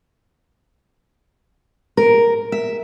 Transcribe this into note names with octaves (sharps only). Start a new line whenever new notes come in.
A#4
E5